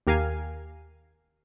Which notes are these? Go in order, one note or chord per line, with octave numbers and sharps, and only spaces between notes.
D#2 G4 A#4 F5 G#5